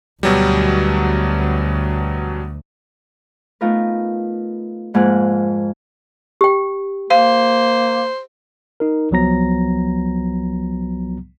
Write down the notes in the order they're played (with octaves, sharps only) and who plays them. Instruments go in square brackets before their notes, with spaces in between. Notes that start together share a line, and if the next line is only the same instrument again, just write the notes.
[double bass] D2 [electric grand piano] B2 F#3 G3
[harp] A3 B3 D#4 F4 A#4 B4
F2 G#2 A#3 F4 G#4 F#6
[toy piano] G4 G5
[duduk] A#3 [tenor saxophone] C5 [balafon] F5
[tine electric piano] D#4 A#4
C2 F3 F#3 B3 A#5 A#6